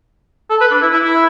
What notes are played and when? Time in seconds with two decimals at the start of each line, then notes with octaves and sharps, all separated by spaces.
0.50 A4
0.60 B4
0.71 D4
0.82 E4
0.93 E4
1.04 E4